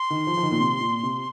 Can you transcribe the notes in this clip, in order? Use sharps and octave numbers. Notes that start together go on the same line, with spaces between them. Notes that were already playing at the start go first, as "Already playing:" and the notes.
Already playing: C6
D#3
F3
F3
D#3
A#2
C3
A#2
C3